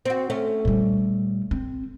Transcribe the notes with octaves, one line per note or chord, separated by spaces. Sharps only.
C4 F#4
A3 C#4
A#2 G3
C4